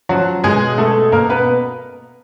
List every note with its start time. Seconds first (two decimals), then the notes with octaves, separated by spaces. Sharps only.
0.09 F3 F#3 F#4
0.44 B2 G#3 G#4
0.78 B2 A3 A4
1.12 B2 A#3 A#4
1.30 B3 B4